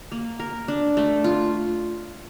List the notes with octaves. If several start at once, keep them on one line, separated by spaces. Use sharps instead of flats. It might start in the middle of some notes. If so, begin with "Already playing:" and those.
A#3
A#4
D4
A3
F4